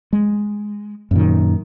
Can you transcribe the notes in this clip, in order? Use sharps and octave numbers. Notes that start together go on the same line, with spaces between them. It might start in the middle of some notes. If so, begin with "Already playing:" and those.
G#3
F#2 A#2 D#3